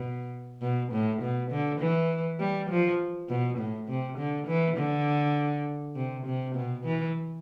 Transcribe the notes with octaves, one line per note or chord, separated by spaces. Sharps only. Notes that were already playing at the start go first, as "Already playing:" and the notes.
Already playing: B2
B2
A2
B2
D3
E3
G3
F3
B2
A2
C3
D3
E3
D3
C3
C3
B2
E3